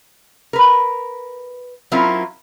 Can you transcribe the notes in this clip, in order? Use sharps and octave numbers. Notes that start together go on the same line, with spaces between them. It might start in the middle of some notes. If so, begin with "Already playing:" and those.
A#4 B4
F#3 C4 C#4 E4 F4 A#4